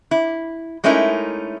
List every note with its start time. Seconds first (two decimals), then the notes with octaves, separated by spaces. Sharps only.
0.11 E4
0.84 G#3 A3 C#4 D#4 E4 A#4